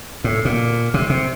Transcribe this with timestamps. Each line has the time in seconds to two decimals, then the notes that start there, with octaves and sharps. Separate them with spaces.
0.24 A2
0.45 A#2
0.94 C3
1.10 C3